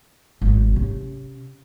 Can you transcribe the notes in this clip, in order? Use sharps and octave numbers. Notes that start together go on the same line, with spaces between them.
G#1 F#2
C3 C#4